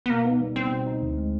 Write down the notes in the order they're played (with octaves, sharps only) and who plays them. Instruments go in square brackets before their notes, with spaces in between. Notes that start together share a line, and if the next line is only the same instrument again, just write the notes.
[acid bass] B3
[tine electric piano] B2 [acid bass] A#3
[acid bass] B3 [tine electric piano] D#4
[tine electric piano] G3
[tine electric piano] B3 [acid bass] C4
[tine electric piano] B2
D#4
D2
G#3